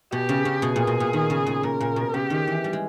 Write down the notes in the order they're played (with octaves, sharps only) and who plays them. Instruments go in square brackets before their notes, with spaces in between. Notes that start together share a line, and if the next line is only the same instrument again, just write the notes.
[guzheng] B2 [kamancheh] G4
[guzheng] C#3
C#3
[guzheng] B2 [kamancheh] G#4
[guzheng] A#2
B2
A#2
D#3
C#3
A#2
[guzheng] A#2 [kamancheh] A#4
[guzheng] A#2
B2
[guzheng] C#3 [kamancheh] G4
[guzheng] D#3
E3
G3
G#3